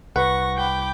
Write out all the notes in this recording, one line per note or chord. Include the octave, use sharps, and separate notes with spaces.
C2 B4 F#5 C#6 A#6
G5 B5 D6